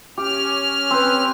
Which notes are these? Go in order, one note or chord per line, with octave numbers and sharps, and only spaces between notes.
C#4 G4 F6
C4 B4